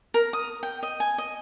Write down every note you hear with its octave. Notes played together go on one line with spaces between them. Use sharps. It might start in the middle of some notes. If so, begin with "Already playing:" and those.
A#4
D#6
G5
D#5
G#5
D#5